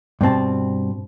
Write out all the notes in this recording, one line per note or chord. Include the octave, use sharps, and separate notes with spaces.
G2 B2 C4 A5